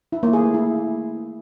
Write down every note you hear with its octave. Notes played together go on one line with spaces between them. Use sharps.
E4
A#3
G#4
A3
E4